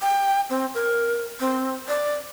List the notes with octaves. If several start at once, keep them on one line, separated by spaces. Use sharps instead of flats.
G5
C4
A#4
C4
D5